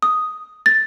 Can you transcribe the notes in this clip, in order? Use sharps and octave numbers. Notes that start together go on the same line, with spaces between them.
D#6
A6